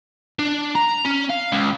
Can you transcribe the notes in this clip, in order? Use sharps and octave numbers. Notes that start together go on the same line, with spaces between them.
D4
A#5
C#4
F5
C#2